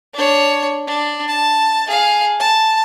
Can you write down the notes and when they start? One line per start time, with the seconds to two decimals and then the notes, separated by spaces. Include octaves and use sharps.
0.14 D4 C#5
0.87 D4
1.28 A5
1.87 G#4 F5
2.40 A5